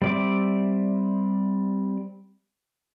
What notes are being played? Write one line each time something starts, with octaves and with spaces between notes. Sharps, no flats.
G3 C4 D5 E5 D6